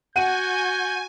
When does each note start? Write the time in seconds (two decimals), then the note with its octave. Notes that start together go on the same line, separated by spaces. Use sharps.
0.16 F#4 F#5 G#5 G6 D#7